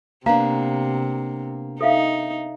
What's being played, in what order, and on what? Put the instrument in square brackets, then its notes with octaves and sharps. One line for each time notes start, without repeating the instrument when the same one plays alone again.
[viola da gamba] C3 [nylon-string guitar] A#3 B3 D4 [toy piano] F5 A#5
[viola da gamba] D#4 [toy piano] A4 E5 F5